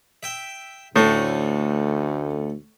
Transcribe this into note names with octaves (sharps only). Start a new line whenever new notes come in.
E5 G5
D2 A2 A3 C#4